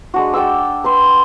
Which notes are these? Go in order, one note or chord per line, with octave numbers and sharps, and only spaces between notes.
G#3 D4 F#4
D5 G5 D6 E6
B4 B5 C6